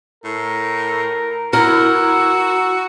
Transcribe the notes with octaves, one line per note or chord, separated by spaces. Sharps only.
A2 A#4
E4 F#4 A#4 E6